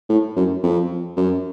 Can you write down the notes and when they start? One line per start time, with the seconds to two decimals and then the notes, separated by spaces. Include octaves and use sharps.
0.09 A2
0.36 F#2
0.63 F2
1.17 F#2